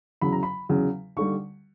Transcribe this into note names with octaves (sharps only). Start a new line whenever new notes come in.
E2 C#3 F#3 B5
A#5
B5
E2 C#3 F#3
D#2 D3 G3 C#6